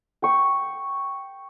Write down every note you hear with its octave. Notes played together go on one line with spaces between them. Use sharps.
G5 C#6